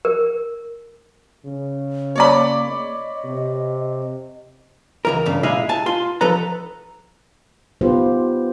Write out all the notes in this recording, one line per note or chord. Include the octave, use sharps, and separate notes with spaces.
A#4
C#3
A#3 C#5 D5 B5
D#5
C3
C#2 E3 A#4
G2 C#3
A#2 G#3 E4 G#4 D#5 F5
G#5 A5
F4 C6
F3 A4 B4 A#5
B3 D#4 F4 G4 B4 C5